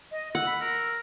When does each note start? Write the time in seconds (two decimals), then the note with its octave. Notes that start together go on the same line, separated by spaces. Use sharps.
0.11 D#5
0.35 F#5 E6
0.47 B5
0.61 A#4